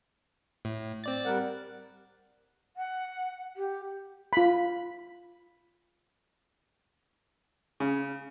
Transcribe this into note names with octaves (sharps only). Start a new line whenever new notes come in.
A2
C4 D5 A6
G3 A#4 F#5
F#5
G4
F4 B5
C#3